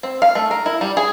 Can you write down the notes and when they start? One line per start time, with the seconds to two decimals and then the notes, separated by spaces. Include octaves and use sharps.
0.03 C4
0.22 F5
0.35 A3
0.51 A#4
0.66 E4
0.81 G3
0.97 G#4